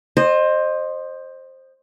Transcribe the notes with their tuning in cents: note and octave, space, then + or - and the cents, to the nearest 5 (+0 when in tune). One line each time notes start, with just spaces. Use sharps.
C5 +15 D#5 -20